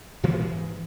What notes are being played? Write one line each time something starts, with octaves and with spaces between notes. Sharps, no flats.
A#2 E3 F3 A#3
G#2 E3 G#3